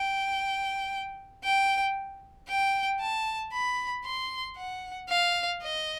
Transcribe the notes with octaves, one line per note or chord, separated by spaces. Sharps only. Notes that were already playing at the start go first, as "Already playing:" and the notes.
Already playing: G5
G5
G5
A5
B5
C6
F#5
F5
D#5